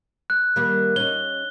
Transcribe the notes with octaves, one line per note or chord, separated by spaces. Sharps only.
F#6
D#3 G3 A#3
C#4 D#4 G7